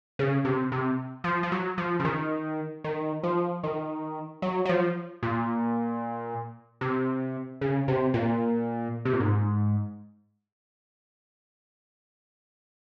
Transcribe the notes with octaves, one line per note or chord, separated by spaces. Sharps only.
C#3
C3
C3
F3
F3
F#3
F3
C#3
D#3
D#3
F3
D#3
F#3
F#3
F3
A#2
C3
C#3
C3
A#2
C3
A#2
G#2